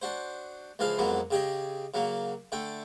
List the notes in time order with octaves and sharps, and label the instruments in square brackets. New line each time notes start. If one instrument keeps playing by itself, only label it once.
[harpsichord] D4 F#4 C5
C#2 E3 F3 G#4 F5
F2 G#2 F#3 A#3 B3
C#3 G4 G#4 D#5
C#3 F#3 A#3
D3 A3 G5